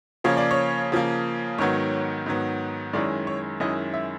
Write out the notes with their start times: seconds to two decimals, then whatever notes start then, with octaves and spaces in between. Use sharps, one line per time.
0.24 C#3 F3 A#3 C#5
0.37 D5
0.51 C#5
0.92 C#3 F3 A#3
1.58 G#2 D#3 F#3 B3 C#5
2.26 G#2 D#3 F#3 B3
2.93 F#2 D#3 G#3 C#4 E4 D5
3.27 C#5
3.60 F#2 D#3 G#3 C#4 E4 D#5
3.93 E5